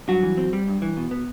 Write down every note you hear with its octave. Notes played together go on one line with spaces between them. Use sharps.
G2 F#3 F#4
E3
C4
G3
G2
E3
B2
B3